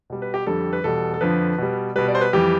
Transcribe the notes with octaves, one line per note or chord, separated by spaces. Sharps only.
B2 G3
B4
G4
F2 D3 G3 A4
B4
E2 B2 G3 A4
A4
F2 D3 F3 B4
B2 G3
B2 G3 B4
D5
C5
B4
F2 E3 G3 G4